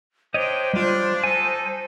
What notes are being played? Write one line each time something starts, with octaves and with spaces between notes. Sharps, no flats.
D4 G4 C5 C#5 D#5 G5
G3 D4 F4
D#4 A4 G#5